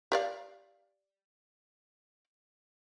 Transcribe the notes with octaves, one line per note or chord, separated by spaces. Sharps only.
G4 D5 F5